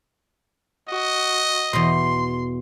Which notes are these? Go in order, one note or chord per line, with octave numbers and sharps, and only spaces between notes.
F#4 D#5
E2 B2 C6